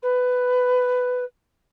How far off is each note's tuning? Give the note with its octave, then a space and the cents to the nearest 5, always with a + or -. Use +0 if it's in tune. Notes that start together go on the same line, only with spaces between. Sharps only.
B4 +10